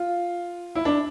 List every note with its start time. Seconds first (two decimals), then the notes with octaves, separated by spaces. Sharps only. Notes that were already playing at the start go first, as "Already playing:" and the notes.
Already playing: F4
0.75 E4
0.85 D4